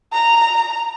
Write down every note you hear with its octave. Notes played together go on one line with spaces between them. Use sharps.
A#5